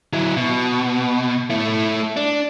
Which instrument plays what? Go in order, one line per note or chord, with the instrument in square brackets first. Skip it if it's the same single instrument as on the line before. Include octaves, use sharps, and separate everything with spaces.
[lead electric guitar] F#3 E4
B2
A3 E4
D4